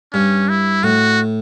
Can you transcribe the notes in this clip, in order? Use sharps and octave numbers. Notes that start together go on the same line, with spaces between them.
G2 C#4
E4
A2 F#4